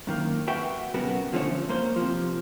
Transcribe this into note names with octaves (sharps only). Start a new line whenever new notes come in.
F#2 D#3 A#3
F#4 B4 E5 F#5 G5
B1 C#3 B3 F#4 A#4 F#5
D3 F3 A3 C#4 C#5
A#3 C5
C3 F3